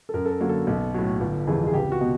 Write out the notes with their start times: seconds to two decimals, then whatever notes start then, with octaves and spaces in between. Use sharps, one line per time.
0.09 A4
0.14 F#2 A#4
0.26 A4
0.31 A#4
0.41 D3 F#3 A#3
0.49 A4
0.67 B1
0.94 A2 F#3
1.20 G1
1.47 F2 C3 E3 G#3
1.67 G#4
1.74 C#2 G4
1.92 F#4
2.01 B2